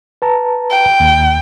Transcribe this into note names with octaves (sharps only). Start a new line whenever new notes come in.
B4 A5 A#5
G5
D#2